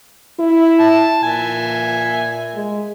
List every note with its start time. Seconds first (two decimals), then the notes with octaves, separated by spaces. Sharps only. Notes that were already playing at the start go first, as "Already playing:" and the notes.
0.39 E4
0.80 A5
1.23 A#2 E5 G#5
2.55 G#3